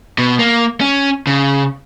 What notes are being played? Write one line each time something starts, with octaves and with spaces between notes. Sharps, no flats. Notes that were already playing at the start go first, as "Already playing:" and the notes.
B2
A#3
C#4
C#3